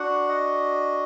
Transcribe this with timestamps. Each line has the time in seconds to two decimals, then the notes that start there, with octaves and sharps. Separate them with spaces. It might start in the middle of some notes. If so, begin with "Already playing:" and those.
Already playing: D4 F#4 F#5
0.28 D#5